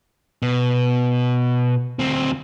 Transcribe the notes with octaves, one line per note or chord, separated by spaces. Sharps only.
B2
D2 C4